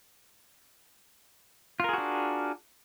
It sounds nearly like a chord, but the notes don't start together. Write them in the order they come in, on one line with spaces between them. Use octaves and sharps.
F4 A#4 G#4 F#4 D4